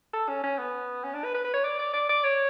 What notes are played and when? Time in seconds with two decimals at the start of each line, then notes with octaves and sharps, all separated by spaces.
0.14 A4
0.29 C#4
0.44 C#4
0.58 B3
1.04 C#4
1.14 D4
1.24 B4
1.34 B4
1.44 B4
1.54 C#5
1.64 D5
1.79 D5
1.94 D5
2.09 D5
2.24 C#5